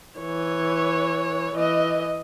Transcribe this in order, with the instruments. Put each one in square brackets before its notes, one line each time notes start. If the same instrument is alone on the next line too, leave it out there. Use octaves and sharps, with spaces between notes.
[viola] E3 C#5
E3 D#5